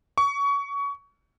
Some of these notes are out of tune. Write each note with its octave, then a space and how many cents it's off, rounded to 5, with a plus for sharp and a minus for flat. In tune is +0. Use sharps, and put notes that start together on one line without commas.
C#6 +25